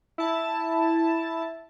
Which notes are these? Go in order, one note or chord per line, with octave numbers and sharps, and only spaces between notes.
E4 A5